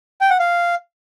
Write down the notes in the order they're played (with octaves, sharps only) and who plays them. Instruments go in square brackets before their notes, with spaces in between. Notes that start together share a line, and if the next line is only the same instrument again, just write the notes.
[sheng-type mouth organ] G5
F#5
F5